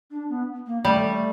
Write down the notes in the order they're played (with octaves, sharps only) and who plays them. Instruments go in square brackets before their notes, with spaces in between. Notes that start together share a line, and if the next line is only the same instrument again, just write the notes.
[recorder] D4
B3
A#3
[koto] G3 [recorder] A3